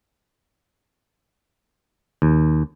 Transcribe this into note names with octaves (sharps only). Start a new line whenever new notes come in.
D#2